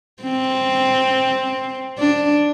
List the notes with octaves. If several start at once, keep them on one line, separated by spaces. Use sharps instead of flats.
C4
D4